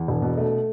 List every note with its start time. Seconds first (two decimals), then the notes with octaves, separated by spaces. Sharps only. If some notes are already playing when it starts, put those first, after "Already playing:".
Already playing: E2
0.08 E1
0.22 B2
0.38 A3